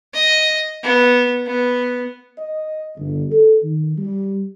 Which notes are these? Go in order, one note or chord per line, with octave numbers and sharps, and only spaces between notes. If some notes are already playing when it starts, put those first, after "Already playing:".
D#5
B3
B3
D#5
G1
A4
D#3
G3